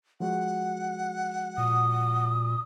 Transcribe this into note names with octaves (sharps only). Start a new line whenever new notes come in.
F3 G#3 F#4 F#5
A#2 D#6